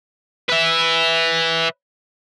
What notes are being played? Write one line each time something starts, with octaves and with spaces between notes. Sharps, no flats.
B4 E5